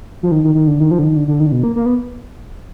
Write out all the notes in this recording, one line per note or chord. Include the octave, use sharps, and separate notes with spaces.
F3
D#3
D#3
D#3
D3
D#3
F3
D3
D#3
D3
D3
D#3
D3
B2
A#3
A#3
B3